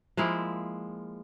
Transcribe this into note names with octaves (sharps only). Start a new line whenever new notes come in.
F3 G#3 A#3 E4